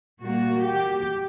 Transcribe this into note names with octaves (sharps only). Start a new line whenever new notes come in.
A#2 G3 A#3 F#4
G4